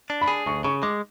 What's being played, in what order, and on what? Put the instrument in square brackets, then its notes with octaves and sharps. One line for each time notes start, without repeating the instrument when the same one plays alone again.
[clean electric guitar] D4
[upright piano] B5
[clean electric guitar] G#4
[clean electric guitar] D2 [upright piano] C#6
[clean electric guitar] C#3 [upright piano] C#6
[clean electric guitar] G#3 [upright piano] D6